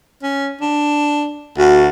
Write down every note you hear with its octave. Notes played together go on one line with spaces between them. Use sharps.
C#4
D4
D2 F#4